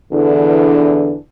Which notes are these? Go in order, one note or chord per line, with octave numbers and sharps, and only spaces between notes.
E2 D3 E3 D4